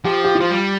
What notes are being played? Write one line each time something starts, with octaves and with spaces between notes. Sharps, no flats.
F3 G4
G4
F4
F3
G3